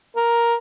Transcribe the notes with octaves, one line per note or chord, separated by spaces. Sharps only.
A#4